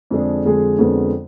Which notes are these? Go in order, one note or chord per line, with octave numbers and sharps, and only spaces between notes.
F2 D3 G#3 D4 G#4
F2 D3 G#3 D4 G#4
F2 D3 G#3 B3